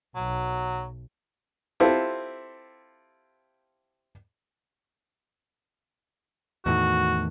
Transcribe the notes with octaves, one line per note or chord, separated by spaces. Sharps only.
B1 F#3
C4 E4 F4 G4 A4
E2 A2 D#3 F#4